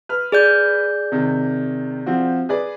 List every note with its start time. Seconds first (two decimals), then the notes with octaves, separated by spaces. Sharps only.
0.09 B4 F6
0.32 G#4 D5 G6
1.12 C3 D#3
2.06 F3 C4 F#4
2.49 G#4 B4 D5